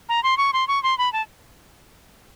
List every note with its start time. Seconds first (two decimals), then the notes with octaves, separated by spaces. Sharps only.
0.09 A#5
0.23 C6
0.38 C#6
0.53 C6
0.68 C#6
0.83 C6
0.98 B5
1.13 A5